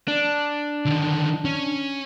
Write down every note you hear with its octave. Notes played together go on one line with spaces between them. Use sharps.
D4
D3 D#3
C#4